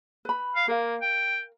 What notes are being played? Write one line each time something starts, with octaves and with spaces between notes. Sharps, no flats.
B4 B5
F5
A#3 A#4 F5
G5